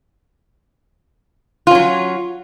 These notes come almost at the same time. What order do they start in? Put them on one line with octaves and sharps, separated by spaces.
F4 C#4 F#3